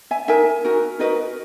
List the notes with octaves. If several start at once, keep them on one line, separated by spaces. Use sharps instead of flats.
E5 G#5
D#4 A#4 E5 G#5
D#4 F#4 A#4
D#4 F#4 A#4 B4 D#5